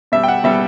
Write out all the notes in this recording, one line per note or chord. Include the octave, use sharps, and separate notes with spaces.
B2 G3 E5
G5
F#5
B2 G3 E5